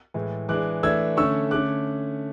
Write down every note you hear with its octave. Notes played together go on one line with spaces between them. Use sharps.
A2 E3 G#3
E3 G#3 D4 D6 F#6
E3 A3 D4 E6 G#6
D3 A3 C#4 C#6 E6
D3 A3 C#4 D6 F#6